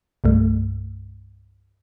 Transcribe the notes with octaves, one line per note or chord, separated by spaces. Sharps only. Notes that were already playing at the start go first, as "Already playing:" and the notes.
C2 G2 A3